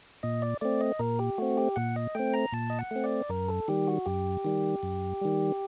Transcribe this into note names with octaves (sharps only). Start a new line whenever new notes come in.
A#2 D#5
D5
A3 C4 D5
D#5
A#2 A#4
G4
A3 C4 F#4
G4
A#2 F#5
D#5
A3 C4 G5
A#5
A#2 A5
D#5
F#5
A3 C4
D5
F#2 A#4
A4
D#3 G3 G4
F#4
F#2 G4
D#3 G3
F#2
D#3 G3